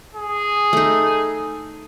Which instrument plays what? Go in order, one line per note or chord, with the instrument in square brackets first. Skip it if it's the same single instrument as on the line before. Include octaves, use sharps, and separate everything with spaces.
[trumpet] G#4
[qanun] A3 D#4